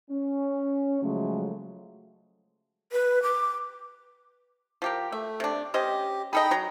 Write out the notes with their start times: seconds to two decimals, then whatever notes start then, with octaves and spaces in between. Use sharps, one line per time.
0.11 C#4
1.02 C#3 F3 F#3 G#3 A3
2.92 B4
3.23 D6
4.82 F3 G4 A#4
5.12 A3 E5
5.40 C3 D4
5.74 C#4 G4 C5 D#5
6.33 D#4 G#4 A4 D#5 G5 B5
6.51 F#3 A#5